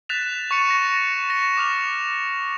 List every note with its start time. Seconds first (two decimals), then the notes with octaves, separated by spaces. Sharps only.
0.09 F#6 A6 B6 E7 F7
0.51 C#6 A6 C#7 D#7 E7
0.70 A#6
1.30 A#6 E7
1.57 D6 F6 F7